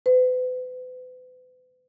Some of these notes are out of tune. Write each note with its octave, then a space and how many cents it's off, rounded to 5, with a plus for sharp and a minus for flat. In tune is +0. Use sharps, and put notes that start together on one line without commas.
B4 +40